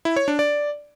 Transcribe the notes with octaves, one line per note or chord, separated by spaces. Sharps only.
E4
C#5
D4
D5